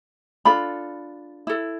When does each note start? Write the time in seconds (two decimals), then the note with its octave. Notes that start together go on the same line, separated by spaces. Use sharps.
0.45 D4 F4 A4 B5
1.47 E4 A4